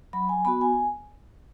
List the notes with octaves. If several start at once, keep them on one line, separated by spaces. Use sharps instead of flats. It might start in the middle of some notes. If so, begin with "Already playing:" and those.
F#3 B5
G#5
B3 F#4 B5
G#5